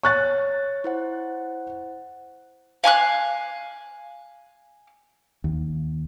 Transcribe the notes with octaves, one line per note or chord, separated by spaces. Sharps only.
C#5 C#6 F#6 A6
E4 C5 F#5
F5 G#5 C6 F#6
D#2